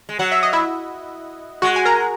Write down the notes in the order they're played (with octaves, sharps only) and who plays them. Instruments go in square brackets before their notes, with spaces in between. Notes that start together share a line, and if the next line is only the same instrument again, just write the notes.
[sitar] G#3
[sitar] F#3 [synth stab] F#5
[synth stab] E5
D#5
E4 E5
[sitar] G#3 [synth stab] F#4 F#5
[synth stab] G#5
A#4 A#5